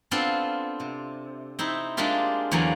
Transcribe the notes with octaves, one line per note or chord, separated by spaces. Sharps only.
B3 C4 D4 F4 A4
C3
C4 D#4 E4
G#3 A#3 C4 D4 F4 G4
E2 D3 F#3 A#3 D5 G#5